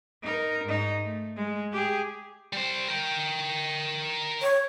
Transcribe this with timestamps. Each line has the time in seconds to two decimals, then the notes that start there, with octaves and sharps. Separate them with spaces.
0.23 D#4 A#4
0.64 G#2 D#4
1.05 A3
1.36 G#3
1.72 G4 G#4
2.53 G3 C5
2.88 A#4 G5
4.42 C#5